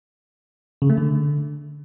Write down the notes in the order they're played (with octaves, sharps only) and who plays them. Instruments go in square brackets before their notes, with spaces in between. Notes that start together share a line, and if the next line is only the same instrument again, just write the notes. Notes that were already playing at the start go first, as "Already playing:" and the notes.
[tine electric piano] C#3
A3
D3